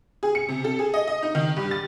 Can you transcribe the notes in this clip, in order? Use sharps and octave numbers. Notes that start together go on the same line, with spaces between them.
G#4
C#7
C3
A4
G#4
D#5
D#5
D#4
D#3
G2
A6